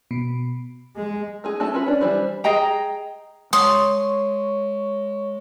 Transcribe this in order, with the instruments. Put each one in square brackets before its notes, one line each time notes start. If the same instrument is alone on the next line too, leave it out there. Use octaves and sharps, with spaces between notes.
[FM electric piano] B2
[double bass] G#3
[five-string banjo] A3 D#4 G#4
A3 F#4 A4 A5
C#4 F4 F#4 B4
C#4 D4
E3 G3 C5 D5
[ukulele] G#4 D#5 G5 A#5
[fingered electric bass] G#3 [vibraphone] C#5 C#6 [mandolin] C6 [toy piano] D#6